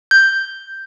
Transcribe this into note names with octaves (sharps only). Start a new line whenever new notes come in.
G6